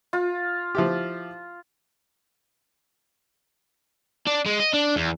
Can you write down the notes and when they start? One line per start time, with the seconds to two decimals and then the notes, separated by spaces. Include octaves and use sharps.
0.13 F4
0.75 F3 E4 G4
4.27 D4
4.46 G#3
4.60 D#5
4.74 D4
4.96 E2